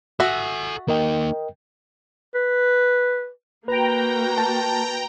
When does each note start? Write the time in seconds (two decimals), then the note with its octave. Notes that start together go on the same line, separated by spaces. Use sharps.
0.20 F#4 A4 E5 G#5
0.88 A#3 D#4 A#4 D#5 G5
2.35 B4
3.68 A#3 F#4 B4 G5 A#5
4.38 A5